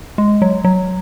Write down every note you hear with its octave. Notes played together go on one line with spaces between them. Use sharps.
G#3
F#3
F#3